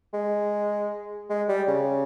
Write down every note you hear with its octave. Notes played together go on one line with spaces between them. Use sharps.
G#3
G#3
G3
C#3